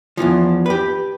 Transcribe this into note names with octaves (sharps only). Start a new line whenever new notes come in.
E2 B2 E3 F3
G4 B4